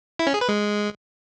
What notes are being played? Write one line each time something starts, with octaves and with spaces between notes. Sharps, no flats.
E4
C#4
G#4
B4
G#3